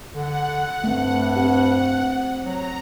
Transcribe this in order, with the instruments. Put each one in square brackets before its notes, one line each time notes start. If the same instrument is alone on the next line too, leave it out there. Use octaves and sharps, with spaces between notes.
[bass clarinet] D3 [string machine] F#5
[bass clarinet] G2 [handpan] A3 C4
[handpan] C4 G4
[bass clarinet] F#3 [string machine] A#5